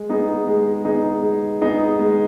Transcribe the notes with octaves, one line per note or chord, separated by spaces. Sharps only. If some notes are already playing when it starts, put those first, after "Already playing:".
Already playing: G#3
B3 D#4 G#4
G#3
B3 D#4 G#4
G#3
B3 D#4 G#4
G#3